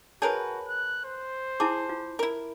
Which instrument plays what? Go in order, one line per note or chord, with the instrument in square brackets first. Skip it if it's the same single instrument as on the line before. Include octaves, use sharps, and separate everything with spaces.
[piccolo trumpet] F#4 [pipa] G#4 A#4 B4 [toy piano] C#5 G#5 A5
[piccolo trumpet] F#6
C5
[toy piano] E4 A5 D6 [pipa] G#4
[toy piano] F4
[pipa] E4 A#4